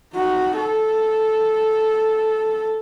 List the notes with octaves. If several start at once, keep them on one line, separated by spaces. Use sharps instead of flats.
D#4 F#4
A4